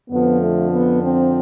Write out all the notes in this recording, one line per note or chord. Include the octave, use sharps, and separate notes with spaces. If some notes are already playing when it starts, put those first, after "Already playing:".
F2 D3 F3 B3
A3
B3
C4